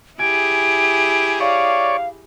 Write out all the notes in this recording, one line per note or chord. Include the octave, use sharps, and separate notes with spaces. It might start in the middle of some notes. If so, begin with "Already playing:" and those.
E4 G4 G#4 G#5 D7
C#5 D5 F5